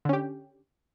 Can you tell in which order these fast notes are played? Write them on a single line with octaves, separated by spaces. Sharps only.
D3 C#4 G4